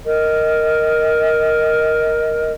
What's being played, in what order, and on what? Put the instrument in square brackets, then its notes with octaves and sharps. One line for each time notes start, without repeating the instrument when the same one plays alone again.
[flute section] A#4 D#5